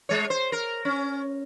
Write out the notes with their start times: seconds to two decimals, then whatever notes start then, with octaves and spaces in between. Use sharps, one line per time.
0.09 G#3 C#5
0.30 C5
0.52 A#4
0.85 C#4